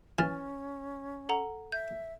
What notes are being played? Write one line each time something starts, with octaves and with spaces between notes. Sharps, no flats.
E3 C#4 F6 A6
A4 F#5 A#5
E5 G6